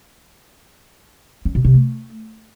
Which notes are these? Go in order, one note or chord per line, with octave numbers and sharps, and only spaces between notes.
C#4
B2
C3
A3